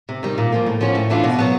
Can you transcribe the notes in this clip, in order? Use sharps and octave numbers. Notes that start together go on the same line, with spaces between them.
C3
D#3 G3
A#2
F3 A#3
A2
F3 A#3 C#4 F#4
A2
E3 A3 D4 F4
B2
F#3 B3